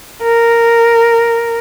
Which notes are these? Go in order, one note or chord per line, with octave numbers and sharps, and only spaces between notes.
A#4